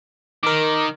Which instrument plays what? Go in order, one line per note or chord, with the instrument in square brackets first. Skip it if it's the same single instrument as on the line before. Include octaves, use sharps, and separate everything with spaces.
[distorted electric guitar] D#3 [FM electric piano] A#4 D6